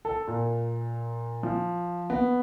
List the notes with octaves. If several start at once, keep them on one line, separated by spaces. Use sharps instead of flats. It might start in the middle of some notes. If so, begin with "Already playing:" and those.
A4
A#2
F3
B3